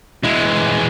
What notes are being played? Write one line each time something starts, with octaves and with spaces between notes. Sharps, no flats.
E3 G#3